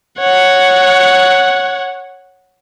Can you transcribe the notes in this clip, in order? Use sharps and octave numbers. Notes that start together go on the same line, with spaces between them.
C#5 F#5